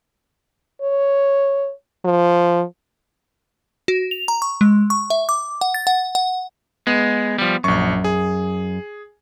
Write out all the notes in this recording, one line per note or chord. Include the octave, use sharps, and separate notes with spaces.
C#5
F3
F#4
F7
A#5
C#6
G#3
C#6
E5
D6
F#5
A6
F#5
F#5
G#3 B3
F3 G3
A#1 F#2 C#6
G#4